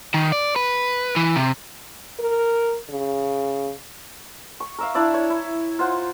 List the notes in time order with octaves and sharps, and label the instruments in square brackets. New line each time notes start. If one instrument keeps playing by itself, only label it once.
[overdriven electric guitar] D#3
D5
B4
E3
C3
[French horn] A#4
C#3
[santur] C#6
A#4 E5 F5
D4 E4 D5 E5
C#5
E4
F4 C5 F#5